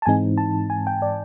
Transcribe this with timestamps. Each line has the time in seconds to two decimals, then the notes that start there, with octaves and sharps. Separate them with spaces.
0.02 A5
0.06 G#2 E3 G#3 C4 D#4 G#5
0.38 A5
0.70 G#5
0.87 G5
1.02 D5